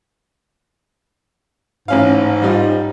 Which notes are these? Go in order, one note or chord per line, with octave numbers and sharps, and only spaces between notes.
A1 G#2 C#4 F5
G3 D#4 F4